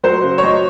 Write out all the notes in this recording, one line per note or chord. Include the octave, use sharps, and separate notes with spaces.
F#3 C5
C#3
C#5
F#3 D#5